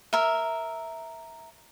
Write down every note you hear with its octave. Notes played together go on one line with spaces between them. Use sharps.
A#4 E5